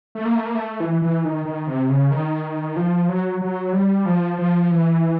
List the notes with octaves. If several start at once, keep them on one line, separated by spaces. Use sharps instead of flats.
A3
A#3
A3
A#3
A3
E3
E3
D#3
D#3
C3
C#3
D#3
F3
F#3
F#3
G3
F3
F3
E3